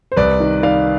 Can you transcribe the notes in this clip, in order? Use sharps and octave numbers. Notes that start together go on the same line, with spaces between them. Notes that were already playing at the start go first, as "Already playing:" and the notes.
C5
C2 B4 D5
D#3
D#3 D5 F5